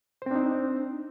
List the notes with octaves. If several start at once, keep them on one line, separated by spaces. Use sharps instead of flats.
C4 D4 D#4 C5